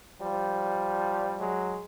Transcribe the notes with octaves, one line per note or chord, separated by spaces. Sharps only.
F3 G3
F#3 G#3